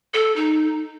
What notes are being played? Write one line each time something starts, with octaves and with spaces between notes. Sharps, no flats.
A4
D#4